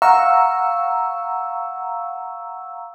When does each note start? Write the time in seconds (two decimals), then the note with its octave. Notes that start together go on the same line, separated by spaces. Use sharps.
0.02 F5 F#5 A#5 C#6 E6